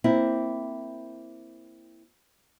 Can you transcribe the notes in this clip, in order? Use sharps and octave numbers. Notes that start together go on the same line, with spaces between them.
A#3 C4 E4